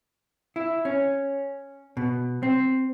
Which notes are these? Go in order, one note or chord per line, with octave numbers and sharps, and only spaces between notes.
E4
C#4
B2
C4